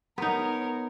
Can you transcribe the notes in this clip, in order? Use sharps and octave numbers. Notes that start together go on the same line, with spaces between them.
B3 D#4 A#4 C#5